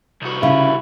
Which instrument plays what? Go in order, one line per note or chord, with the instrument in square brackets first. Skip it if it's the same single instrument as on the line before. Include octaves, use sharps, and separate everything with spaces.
[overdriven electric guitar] C2 F#4
[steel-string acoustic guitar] C#3 [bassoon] E4